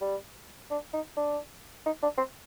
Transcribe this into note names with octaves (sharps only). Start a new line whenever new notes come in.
G3
D4
D#4
D4
D#4
D4
C4